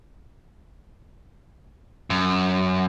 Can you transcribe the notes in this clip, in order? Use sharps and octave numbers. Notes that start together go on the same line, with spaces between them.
F#2